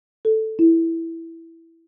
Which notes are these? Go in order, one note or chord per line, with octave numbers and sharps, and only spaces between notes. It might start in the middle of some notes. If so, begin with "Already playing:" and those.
A4
E4